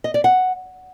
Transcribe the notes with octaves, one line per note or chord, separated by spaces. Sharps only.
D#5
D5
F#5